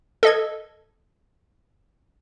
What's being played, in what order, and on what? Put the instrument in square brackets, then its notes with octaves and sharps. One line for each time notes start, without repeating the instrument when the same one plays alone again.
[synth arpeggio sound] A4 D#5 G#6